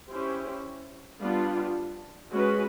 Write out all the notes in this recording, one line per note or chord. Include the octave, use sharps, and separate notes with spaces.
C#4 E4 G4 C5
G3 B3 D4 F4
G#3 C#4 F#4 B4